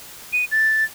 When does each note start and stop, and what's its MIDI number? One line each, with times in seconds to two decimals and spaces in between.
0.33 0.45 99
0.52 0.85 93